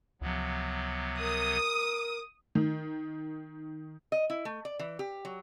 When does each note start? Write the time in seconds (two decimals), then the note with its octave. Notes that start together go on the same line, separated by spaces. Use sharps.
0.21 C#2 C3 F3 F#3 B3
1.19 A#4 D#6
2.55 D#3
4.12 D#5
4.30 E4
4.45 A3
4.65 D5
4.79 E3
4.99 G4
5.25 F#3